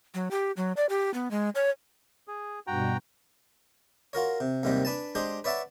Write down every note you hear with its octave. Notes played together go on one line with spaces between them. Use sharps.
F#3
G4
F#3
D5
G4
B3
G#3
C#5
G#4
G2 B2 F#4 G5 A#5
F4 F#4 A#4 C#5
C3
D#2 G#2 C3 D#3 G3
D4 B4 G#5 A5
G#3 D4 G4 G#4 C5
B4 C#5 D5 E5 F#5 A5